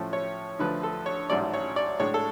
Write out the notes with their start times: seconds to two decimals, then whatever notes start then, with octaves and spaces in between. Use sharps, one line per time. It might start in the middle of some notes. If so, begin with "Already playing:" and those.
Already playing: A2 F3 A3 C#4
0.13 C#5
0.59 D2 D3 F3 A3 B4
0.83 A4
1.06 C#5
1.30 A1 G#2 F#3 A3 C#4 D5
1.54 C#5
1.76 D5
2.00 A2 G#3 D4 C#5
2.14 A4